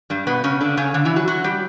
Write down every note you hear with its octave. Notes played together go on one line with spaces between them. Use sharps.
G2 G3
B2 B3
C#3 C#4
D3 D4
C#3 C#4
D3 D4
E3 E4
F#3 F#4
F#3 F#4
G3 G4